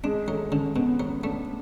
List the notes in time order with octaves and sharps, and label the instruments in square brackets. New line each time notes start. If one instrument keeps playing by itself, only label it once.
[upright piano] G#3 [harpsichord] D4
[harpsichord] F#3 [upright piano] A3
[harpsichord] D3 [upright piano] C#4
[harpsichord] B2 [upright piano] B3
[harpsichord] F#3 [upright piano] C#4
[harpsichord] A3 [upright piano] D4